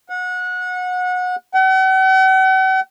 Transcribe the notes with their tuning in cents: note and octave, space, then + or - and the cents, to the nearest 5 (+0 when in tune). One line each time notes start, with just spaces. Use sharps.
F#5 -25
F#5 +45